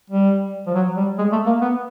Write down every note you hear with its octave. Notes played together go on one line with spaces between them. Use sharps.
G3
F3
F#3
G3
G#3
A3
A#3
B3